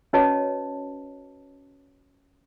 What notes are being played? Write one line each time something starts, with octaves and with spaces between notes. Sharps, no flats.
C#4 F#4 B4 C#5 D#5 A5